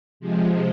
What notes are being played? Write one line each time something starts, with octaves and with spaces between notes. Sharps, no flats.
C3 F3 G#3